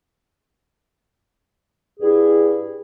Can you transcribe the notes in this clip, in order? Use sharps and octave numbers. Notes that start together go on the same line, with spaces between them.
G2 E4 G#4